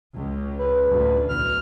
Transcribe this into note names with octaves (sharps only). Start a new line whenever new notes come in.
C#2
B4
D2 A2
B1 F6